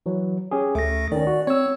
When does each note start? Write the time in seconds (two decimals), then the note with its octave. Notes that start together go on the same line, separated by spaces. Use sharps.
0.06 E3 F#3
0.51 C#4 G4 G#4
0.75 D2 A3 A#6
1.12 D#3 C#4 D5
1.27 F#4
1.47 C4 C#5 E6